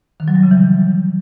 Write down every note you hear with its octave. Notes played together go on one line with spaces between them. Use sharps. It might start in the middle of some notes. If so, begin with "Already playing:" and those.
D#3
F#3
G3
C#3
E3